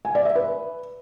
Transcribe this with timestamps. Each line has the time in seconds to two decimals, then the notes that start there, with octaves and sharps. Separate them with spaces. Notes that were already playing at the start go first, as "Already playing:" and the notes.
0.05 G#5
0.15 D5
0.25 E5
0.35 B4